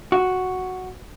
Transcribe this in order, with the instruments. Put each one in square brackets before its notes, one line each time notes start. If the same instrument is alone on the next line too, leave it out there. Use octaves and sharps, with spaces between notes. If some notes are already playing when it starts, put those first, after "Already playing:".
[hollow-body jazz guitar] F#4